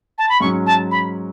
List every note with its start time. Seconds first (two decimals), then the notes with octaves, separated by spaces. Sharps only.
0.18 A5
0.29 B5
0.41 G#2 F#3 C#4 C#6
0.66 A5
0.91 B5